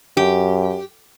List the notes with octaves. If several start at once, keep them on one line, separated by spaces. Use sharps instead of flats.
F#2 G4